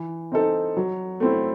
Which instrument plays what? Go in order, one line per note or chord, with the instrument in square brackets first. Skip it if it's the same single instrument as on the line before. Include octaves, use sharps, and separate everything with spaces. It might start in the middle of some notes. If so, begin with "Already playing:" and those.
Already playing: [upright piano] E3
C4 D#4 A4
F#3
A3 C4 E4